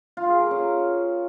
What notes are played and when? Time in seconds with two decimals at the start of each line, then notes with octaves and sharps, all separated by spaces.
0.17 F4
0.28 G#4
0.40 A#4
0.51 C#4